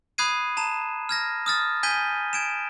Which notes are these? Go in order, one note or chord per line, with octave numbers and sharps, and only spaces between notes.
B5 D#6 F#6 G#6 C7 D#7
A5 A#5 E7
F6 G#6 A#6
D#6 F6 A6
G#5 G6 G#6 B6 D#7 G7
G#6 D7 E7